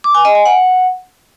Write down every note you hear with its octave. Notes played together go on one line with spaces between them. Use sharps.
D6
G#5
D#5
G#5
F#5